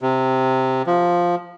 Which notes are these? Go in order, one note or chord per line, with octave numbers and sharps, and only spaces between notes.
C3
F3